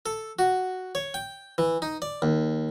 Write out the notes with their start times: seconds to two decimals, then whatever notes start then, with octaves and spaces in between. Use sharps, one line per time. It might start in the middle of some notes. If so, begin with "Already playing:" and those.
0.06 A4
0.39 F#4
0.95 C#5
1.14 G5
1.58 E3
1.82 D#4
2.02 D5
2.22 D#2